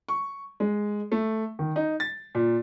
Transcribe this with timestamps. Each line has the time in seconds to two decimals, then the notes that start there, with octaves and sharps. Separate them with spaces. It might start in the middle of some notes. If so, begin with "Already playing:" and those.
0.08 C#6
0.60 G#3
1.12 A3
1.59 D#3
1.76 D#4
2.00 A6
2.35 A#2